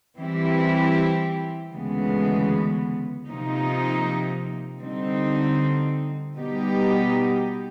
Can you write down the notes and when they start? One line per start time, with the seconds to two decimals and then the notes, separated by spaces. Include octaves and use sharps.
0.17 E3 G3 C4 E4 G4
1.72 D2 C#3 E3 G#3 B3
3.27 C3 F3 A#3 D#4
4.81 D3 G3 C4 D#4
6.36 B2 G3 B3 D#4 G4